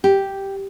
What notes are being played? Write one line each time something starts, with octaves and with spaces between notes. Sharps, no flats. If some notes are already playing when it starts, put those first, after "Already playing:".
G4